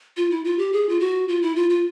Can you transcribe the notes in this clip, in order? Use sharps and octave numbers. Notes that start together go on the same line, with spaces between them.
F4
E4
F4
G4
G#4
F4
F#4
F4
E4
F4
F4